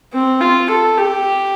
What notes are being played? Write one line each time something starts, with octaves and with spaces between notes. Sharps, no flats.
C4
F4
A4
G4